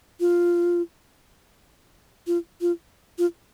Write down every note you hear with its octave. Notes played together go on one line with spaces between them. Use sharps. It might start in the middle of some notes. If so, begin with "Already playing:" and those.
F4
F4
F4
F4